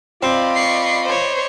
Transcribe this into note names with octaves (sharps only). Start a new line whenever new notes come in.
C4 F4 D5 D#5 B5
C#6 C7
C5 C#5